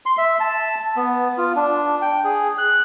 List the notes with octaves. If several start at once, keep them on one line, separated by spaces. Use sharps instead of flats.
C6
E5
A5
B3
F4
D4
G5
G#4
F#6